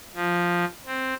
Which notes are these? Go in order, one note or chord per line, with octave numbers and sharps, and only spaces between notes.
F3
C4